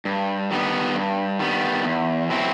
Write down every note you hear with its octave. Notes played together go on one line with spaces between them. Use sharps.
G2
D#3 G3 B3
G2
D#3 G3 B3
E2
B2 F#3 C4 E4